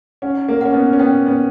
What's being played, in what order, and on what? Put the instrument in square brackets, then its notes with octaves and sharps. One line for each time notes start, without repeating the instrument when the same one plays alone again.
[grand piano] C#4 [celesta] F#5
[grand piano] A#3
[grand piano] C#4 [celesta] F#5
[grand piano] B3
C#4
[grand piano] B3 [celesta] G5
[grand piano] B3